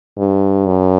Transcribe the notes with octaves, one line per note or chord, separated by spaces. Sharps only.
G2
F#2